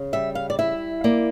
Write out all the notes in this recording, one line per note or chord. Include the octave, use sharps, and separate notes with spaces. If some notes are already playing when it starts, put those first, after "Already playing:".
Already playing: C#3
G3 E5
F5
D5
E4 E5
A#3 D5